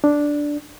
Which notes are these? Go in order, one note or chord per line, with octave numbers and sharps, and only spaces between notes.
D4